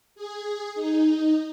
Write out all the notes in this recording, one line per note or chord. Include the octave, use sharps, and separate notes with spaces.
G#4
D#4